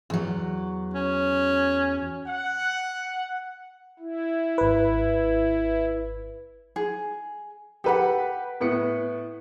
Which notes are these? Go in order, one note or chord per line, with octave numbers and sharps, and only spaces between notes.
E2 F#3
C#4
F#5
E4
G#1 B4
G#4
G4 A4 B4 F#5
A2 B3 C#7